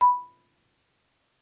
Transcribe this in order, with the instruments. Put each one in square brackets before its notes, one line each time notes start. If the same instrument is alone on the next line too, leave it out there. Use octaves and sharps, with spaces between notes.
[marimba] B5